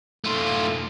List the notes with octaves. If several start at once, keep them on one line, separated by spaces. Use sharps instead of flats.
A3 F4